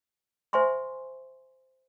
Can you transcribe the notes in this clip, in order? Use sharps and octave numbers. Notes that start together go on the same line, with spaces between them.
C5 E5 G#5 C6 C#6